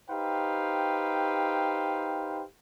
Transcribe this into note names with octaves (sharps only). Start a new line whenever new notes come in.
D#4 G4 B4 C5 F5 G5